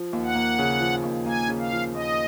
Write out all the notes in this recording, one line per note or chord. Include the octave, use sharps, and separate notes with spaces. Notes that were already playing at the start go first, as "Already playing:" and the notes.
Already playing: F3
D#2
F#5
A#3
C#3
F3
D#2
A#3 G#5
C#3
F5
F3
D#2 D#5